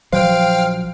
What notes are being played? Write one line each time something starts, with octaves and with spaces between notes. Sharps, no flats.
A#1 F3 F#3 C5 F5 G5 F6